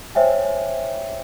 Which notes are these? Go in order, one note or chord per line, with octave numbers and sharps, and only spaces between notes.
C5 C#5 E5 G5 G#5